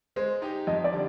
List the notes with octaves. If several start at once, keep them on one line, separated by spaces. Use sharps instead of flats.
G#3 C5
D#4 G4
F2 D#5
D5
D3 G3 D4